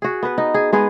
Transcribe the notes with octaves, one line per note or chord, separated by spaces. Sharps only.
F#4 G#4
B3 B4
D#4
G#4
G#3 B3 G#4